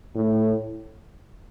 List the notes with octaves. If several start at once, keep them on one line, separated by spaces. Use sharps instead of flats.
A2